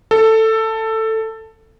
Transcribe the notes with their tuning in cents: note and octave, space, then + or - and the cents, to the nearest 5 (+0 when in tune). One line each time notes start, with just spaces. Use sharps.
A4 +10